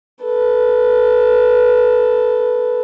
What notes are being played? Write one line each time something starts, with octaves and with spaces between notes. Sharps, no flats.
A4 B4